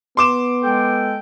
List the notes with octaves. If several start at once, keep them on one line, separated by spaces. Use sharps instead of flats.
B3 C6 D6 E7
G#3 A4 G5